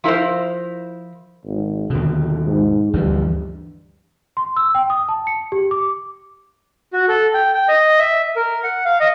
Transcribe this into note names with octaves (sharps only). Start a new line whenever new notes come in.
F3 E4 G#4 A#4 C5
G#1
D#2 B2 D3
G#2
D2 G2 E3 F3
C6
E6
G5
D#6
A5
C#7
G4
D6
F#4
A4
G5
G5
D#5
E5
A#4
F#5
F5
D#5